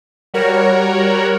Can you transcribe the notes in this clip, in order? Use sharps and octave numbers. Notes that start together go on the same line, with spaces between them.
G3 F#4 A#4 C#5